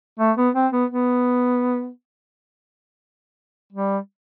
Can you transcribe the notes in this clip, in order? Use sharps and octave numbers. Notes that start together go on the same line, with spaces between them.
A3
B3
C4
B3
B3
G3